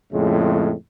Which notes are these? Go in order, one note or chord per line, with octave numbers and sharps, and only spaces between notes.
F2 A2 C#3 G#3